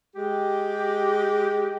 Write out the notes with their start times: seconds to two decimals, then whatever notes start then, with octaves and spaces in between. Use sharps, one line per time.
0.15 G#3 G4